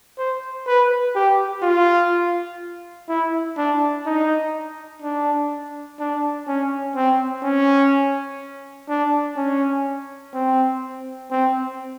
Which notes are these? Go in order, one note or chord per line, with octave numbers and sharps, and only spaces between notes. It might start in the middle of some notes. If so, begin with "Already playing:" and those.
C5
B4
G4
F4
E4
D4
D#4
D4
D4
C#4
C4
C#4
D4
C#4
C4
C4